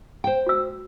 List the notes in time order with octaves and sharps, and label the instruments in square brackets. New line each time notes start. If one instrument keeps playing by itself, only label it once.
[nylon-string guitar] C5 G5
[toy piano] F#4 E6